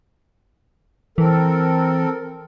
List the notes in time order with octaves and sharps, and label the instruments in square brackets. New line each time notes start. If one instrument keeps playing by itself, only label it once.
[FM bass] E3 [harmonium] C4 A4 A#4